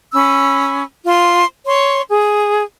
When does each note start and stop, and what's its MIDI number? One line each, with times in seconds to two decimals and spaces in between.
0.13 0.83 61
0.13 0.83 83
0.13 0.83 88
1.05 1.45 65
1.05 1.45 84
1.66 2.02 73
1.66 2.02 84
2.08 2.64 68